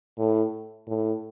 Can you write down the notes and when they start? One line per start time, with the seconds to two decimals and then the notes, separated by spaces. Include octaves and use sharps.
0.18 A2
0.88 A2